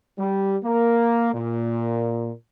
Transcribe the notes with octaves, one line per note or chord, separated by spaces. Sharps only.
G3
A#3
A#2